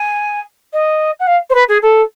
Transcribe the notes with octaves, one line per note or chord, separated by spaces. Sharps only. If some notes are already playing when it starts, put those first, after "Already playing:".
Already playing: G#5
D#5
F#5
F5
C5
B4
G#4
A4